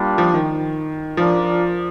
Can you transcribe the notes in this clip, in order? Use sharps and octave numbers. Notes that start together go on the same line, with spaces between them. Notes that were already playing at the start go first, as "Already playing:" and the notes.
Already playing: G3 A#3 D4 F4
F3
D#3
F3 D4 F4 A#4 D5